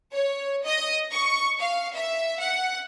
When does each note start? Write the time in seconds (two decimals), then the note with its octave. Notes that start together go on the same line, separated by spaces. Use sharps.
0.13 C#5
0.66 D#5
1.12 C#6
1.60 F5
1.95 E5
2.40 F#5